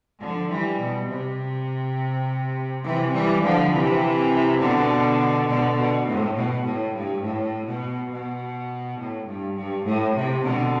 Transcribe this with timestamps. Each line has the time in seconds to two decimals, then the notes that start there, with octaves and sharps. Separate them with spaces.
0.21 D3 F3
0.50 E3 G3
0.79 B2
1.09 C3
2.84 C3 E3
3.13 E3 G3
3.42 D3 F3
3.71 C3 E3
4.59 B2 D3
5.47 B2 D3
5.76 B2
6.05 A2
6.34 B2
6.64 A2
6.94 G2
7.22 A2
7.66 B2
8.10 B2
8.98 A2
9.27 G2
9.56 G2
9.85 A2
10.15 C3
10.43 B2 D3